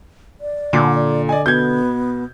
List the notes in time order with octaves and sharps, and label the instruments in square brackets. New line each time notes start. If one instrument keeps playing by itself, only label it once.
[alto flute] D5
[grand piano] A#2 [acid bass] D3 [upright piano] D6
[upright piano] D5 G#5 [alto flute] D#5
[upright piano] B2 G#6 [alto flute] B3 [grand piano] G6